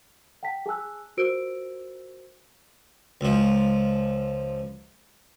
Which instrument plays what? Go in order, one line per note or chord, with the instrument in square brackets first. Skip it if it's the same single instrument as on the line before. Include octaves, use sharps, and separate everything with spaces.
[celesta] F#5 G5 A5 B6
G#4 G#5 A5 E6 F#6
F4 F#4 A#4 C5 E6 D7
[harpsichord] C#2 F3